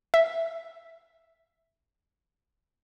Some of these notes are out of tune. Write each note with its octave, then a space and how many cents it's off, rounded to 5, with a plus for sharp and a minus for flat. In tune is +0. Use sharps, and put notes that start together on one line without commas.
E5 +0